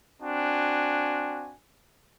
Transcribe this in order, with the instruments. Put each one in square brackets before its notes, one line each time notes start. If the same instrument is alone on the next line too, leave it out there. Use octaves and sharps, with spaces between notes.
[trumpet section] C4 D4 F#4 G#5